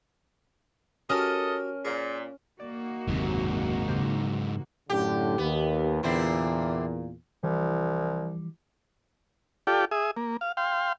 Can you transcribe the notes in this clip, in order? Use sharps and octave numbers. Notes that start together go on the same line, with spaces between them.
C#4 F#4 G4 A4 A#4 D#5 A5
A#2 G#4 C5
A#3 D#4 F#4 D5
F#1 D#2 G#2 C3 F#3
C#3 G4 C5
F#2 A2 D3 G4
D#2 B3
E2 A#2 D3 C4 E4
C2 E3 F3 G3
F4 G4 A4 D5 G5
G#4 E5 D#6
A#3
F5
F5 G5 C6